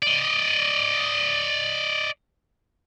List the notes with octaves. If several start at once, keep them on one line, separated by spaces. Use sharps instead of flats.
D5 D#5